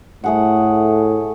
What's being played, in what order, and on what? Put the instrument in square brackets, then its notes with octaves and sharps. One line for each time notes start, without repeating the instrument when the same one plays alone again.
[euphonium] A2 [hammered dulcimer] A3 G#4 F#5